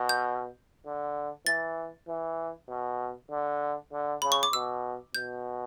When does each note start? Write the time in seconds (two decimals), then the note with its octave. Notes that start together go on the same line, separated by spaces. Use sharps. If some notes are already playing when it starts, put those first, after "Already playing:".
Already playing: B2
0.09 G6
0.86 D3
1.46 E3 A6
2.08 E3
2.69 B2
3.31 D3
3.93 D3
4.22 C#3 B5
4.32 C#6
4.43 D6
4.53 B2 E6
5.15 B2 G6